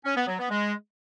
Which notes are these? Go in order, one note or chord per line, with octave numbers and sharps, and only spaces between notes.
C#4
B3
F#3
B3
G#3